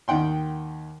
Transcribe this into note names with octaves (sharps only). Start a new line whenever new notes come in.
D#2 D#3 F#5 G5 C6